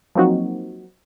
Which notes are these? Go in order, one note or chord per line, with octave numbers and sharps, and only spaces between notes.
F3 F#3 A#3 C4 D#4 F#4